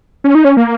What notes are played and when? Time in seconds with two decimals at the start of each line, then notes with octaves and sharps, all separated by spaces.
0.24 C#4
0.35 D#4
0.45 C#4
0.57 A#3